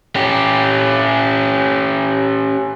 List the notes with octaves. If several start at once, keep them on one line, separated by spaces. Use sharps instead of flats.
C#4 G4